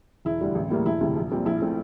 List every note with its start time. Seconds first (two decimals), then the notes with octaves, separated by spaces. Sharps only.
0.25 E1 E4
0.41 D2 D3 G3
0.55 A1
0.70 A2 G3 A#3
0.86 E1 E4
1.01 D2 C3 E3
1.16 A#1
1.31 A#2 G3 C4
1.45 A#1 E4
1.61 A#2 A3 C4